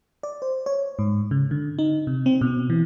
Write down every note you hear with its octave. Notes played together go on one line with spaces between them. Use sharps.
D5
C5
C#5
G#2
C#3
D3
D#4
C3
C4
B2
E3